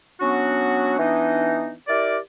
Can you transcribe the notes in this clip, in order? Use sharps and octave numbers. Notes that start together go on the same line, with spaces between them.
F#3 B3 C#4 D4 F#4
E3 B3 D4 D#4
E4 G4 A#4 D5